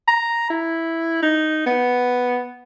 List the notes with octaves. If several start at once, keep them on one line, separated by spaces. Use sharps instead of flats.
A#5
E4
D#4
B3